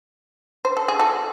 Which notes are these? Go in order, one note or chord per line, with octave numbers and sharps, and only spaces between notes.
C5
A4
G#4
F#4 A4